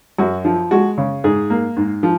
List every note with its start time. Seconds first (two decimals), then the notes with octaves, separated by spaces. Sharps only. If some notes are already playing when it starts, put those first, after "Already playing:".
0.18 F#2 F#4
0.45 F3
0.71 G#3 F#4
0.98 C#3
1.24 G#2 G#4
1.50 A#3
1.77 G#2
2.03 F3